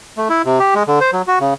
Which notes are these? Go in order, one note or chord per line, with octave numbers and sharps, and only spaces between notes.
A3
E4
C3
G4
G#3
D3
C5
F#3
F#4
C#3